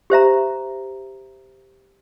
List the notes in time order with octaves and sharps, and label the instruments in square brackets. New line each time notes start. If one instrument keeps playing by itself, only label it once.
[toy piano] G4 C5 E5 A#5